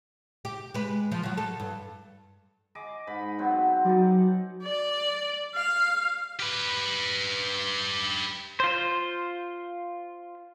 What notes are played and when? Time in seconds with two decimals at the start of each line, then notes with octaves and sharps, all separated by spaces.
0.45 G4
0.74 G#3 B4
1.12 F3
1.23 F#3 F#4
1.37 A4
1.60 G2
2.75 G#4 D#5 D6
3.07 G#2 B5
3.38 F#3 B3 C4
3.85 F#3 D#4 G#4 D5
4.63 D5
5.55 F5
6.40 G4 B4
8.60 F4 C5